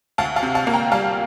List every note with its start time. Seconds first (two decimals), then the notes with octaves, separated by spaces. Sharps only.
0.18 D2 F5 A5
0.36 F5 A5
0.43 C3
0.55 F5 A5
0.67 A#3
0.73 G5 A#5
0.92 G3 F5 A5